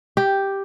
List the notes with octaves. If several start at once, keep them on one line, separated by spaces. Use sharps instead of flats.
G4